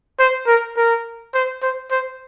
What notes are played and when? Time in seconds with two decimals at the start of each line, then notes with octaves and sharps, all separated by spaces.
0.19 C5
0.47 A#4
0.77 A#4
1.34 C5
1.62 C5
1.91 C5